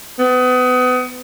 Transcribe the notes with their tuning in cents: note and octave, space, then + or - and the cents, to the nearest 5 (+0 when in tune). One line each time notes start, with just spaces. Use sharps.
B3 +30